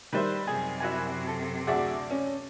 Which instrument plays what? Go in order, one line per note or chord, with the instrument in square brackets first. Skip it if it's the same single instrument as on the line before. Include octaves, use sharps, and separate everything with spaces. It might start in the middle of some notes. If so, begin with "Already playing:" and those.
[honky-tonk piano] D#3 G3 [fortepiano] B4 C5 E5
[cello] F#2 C3 [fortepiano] G#4
[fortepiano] E4 F#4 G#5
A4
[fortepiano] D2 D5 D6 [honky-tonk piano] F#4 G#4 E5
[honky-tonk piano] C#4